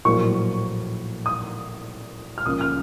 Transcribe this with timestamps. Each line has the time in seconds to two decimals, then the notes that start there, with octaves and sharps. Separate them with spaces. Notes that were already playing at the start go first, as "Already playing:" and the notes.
0.05 A#1 A2 F#3 A#3 C#6
1.26 D#6
2.38 F6
2.46 C#2 C#3 F3 A#3 D#6
2.61 F6